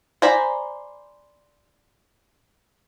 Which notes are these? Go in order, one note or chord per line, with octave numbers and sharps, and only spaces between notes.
C5 D5 G#5 A#5 B5